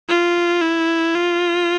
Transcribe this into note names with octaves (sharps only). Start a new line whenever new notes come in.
F4
E4
F4